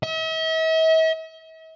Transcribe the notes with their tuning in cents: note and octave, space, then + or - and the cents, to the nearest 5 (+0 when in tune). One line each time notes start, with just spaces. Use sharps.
E5 -45